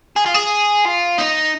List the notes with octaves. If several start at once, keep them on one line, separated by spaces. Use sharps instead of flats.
G#4
F4
G#4
F4
D#4